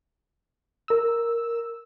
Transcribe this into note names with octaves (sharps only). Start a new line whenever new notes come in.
A#4 E6